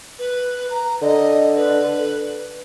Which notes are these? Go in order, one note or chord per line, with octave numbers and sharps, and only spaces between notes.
B4
A#5
D3 D#5
B4